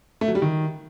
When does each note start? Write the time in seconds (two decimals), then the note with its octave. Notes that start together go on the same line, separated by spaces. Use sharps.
0.21 A3
0.28 F#3
0.35 G3
0.42 D#3